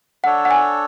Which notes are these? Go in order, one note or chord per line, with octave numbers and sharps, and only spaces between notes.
D4 A4 C#5 F#5
F#5
G#5